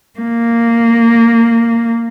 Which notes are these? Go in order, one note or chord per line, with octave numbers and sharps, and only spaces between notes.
A#3